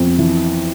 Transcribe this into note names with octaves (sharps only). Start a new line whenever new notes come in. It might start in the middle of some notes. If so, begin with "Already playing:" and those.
Already playing: F2
E3